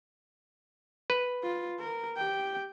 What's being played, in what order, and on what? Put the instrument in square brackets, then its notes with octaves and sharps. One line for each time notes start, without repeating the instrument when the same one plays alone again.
[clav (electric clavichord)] B4
[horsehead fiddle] F4
A#4
G4 G5